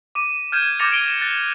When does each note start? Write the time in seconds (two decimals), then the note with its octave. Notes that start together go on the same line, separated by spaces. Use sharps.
0.15 D6 D#7
0.52 F6 G6 G#6 D#7 E7
0.79 D6 G6 A6 A#6 C#7 F7
0.92 D7 D#7 G7
1.21 F#6 A6